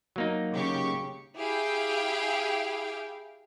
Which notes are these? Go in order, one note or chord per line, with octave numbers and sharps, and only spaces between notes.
F#3 A#3 D#4
C#3 G4 C#6
E4 G4 G#4 F5 G5